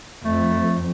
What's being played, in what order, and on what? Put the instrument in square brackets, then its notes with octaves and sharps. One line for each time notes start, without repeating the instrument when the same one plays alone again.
[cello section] F2 [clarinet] A3